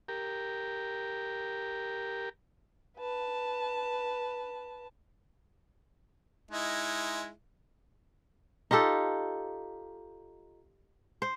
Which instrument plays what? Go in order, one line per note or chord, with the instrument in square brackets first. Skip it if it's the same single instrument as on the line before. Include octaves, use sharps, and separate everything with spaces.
[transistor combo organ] G4 A#4
[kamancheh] B4 A5
[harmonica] G#3 D#4 E4
[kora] D#4 F4 G4 A4
C5